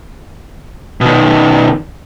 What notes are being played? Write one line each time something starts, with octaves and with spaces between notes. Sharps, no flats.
B2 D#3